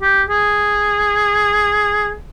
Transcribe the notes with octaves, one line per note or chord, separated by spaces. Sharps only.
G4
G#4